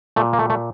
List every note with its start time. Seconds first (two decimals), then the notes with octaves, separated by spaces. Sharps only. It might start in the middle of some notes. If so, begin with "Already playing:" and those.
0.16 A#2 A3
0.33 A#3
0.39 A3
0.50 A3